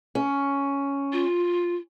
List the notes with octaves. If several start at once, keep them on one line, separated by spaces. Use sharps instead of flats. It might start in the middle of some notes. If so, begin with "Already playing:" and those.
C#4
F4